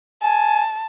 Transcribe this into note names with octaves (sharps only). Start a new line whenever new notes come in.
G#5 A5